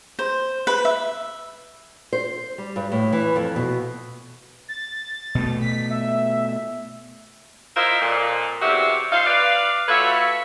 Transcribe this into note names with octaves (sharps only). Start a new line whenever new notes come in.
C5
B4
E5
C5
G3
G2
A2
E3
F2
B2
A6
B2 A3
B6
E5
E4 F4 A#4 C5 D#5 E5
F2 A#2
E2 C3 F#4 G4 E5 F5
D#4 F4 C5 F5
B4 D5 F5
A3 F4 F#4 B4 C#5 E5